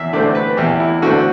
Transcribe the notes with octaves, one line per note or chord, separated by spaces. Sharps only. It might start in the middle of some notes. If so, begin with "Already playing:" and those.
Already playing: E2 E5
D3 A3 C4 D5
B4
E2 G4
E4
D3 A3 C4 F#4